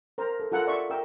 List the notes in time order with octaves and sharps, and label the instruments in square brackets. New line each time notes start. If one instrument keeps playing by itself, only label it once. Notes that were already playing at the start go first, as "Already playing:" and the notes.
[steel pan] A#4 C5 A#5
A4
F4 A4 A#4 F#5
D5 E5 C6 C#6
A#4 E5 G5 E6